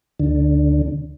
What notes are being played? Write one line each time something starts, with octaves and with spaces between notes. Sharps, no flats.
D2 D3